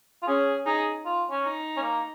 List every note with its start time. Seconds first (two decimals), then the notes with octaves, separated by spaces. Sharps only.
0.22 F4
0.28 C#4 G#4
0.66 D#4 G#4
1.05 F4
1.30 C#4
1.44 D#4
1.77 C#4
1.82 A#3